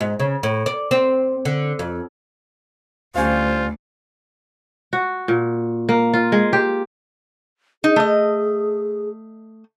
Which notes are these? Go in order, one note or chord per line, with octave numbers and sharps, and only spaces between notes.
G#2
C#3
A2
D5
C4
D3
F2
D2 G3 C#4 F4 C5 F5
F#4
A#2
A#3
F4
G#3
G4
D#4 G#4
A3 D#5